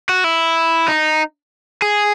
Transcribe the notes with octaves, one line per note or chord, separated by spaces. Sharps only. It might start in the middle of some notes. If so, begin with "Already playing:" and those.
F#4
E4
D#4
G#4